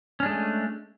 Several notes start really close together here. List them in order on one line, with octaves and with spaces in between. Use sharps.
C#4 D4 G#3 A3